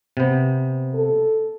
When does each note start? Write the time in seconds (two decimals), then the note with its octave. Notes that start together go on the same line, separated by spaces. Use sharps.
0.17 C3 B3
0.94 A4